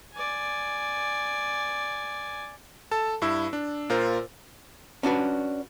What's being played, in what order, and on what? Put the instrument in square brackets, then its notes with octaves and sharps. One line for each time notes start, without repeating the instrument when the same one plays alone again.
[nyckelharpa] D5 G#5
[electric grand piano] A4 A5
G2 E4 E6
D4
A#2 F4 A#4 C5
[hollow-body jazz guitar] C#4 D4 F#4 B4